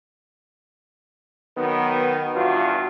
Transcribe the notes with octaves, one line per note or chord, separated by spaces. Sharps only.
D#3 F#3 B3
E2 G2 F4 F#4